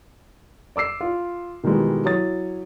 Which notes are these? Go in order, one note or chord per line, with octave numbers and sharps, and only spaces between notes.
D5 D6 E6 C7
F4
B2 D#3 E3 G3 G#3
F#3 E4 C#5 D#6 A6